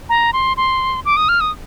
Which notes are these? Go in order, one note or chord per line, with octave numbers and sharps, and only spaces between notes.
A#5
C6
C6
D6
D#6
F6
D#6